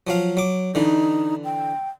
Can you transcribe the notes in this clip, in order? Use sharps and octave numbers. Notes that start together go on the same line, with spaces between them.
F3 F#3 F5
F#3 D6
D3 E3 D#4
G5